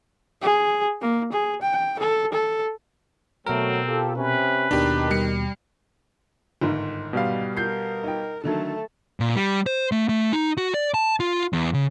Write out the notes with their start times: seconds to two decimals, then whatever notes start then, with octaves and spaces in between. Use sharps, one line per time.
0.42 G#4
1.01 A#3
1.33 G#4
1.62 G5
1.99 A4
2.33 A4
3.47 B2 F#3 A3 C4 A#4
3.87 F4 G4 A4
4.16 C3 C#4 B4
4.71 D#2 B2 D#3 D4 G4
5.11 G3 C#7
6.61 G1 G#2 D#3
7.13 B2 G3 F5
7.57 A#4 G6 C7
8.04 D#4 G5
8.44 D3 D#3 F#3 A3 A4
9.20 A#2
9.36 G3
9.66 C5
9.92 A3
10.09 A3
10.32 D#4
10.57 F#4
10.74 D5
10.94 A5
11.20 F4
11.53 E2
11.74 C#3